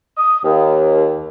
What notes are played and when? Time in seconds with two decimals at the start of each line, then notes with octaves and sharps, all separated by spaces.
0.17 D#6
0.43 D#2